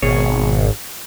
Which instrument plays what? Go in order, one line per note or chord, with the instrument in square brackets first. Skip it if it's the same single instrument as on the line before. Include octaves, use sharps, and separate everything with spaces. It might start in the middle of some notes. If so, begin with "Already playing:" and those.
[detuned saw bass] G#1 [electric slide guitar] B2 G#4 C#5